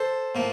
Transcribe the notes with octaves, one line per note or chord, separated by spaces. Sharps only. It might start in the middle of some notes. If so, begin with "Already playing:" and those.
Already playing: A4 C5
A2 F3 A#3